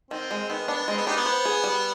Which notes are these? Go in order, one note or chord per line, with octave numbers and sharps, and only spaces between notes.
D#3 C4
G#3
D#3 B3
B3 D4
G#3 C4
B3
D4 D#4 G4
B3
C5
G#4
G3